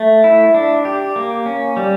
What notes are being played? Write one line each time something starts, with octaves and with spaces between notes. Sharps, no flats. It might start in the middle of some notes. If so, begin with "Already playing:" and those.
Already playing: A3
E4
D4
G4
A#3
C#4
G3